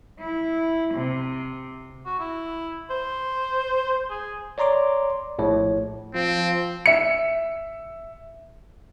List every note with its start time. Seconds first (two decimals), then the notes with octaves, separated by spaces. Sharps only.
0.19 E4
0.94 C3
2.06 F#4
2.20 E4
2.90 C5
4.10 G#4
4.58 C#5 D5 A#5 C6 D6
5.38 A#1 A2 C#5
6.15 F3 C4
6.86 E5 C#7